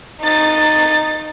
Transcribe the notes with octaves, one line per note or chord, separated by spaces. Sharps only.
D#4 A6